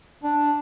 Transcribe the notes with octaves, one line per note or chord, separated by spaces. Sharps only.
D4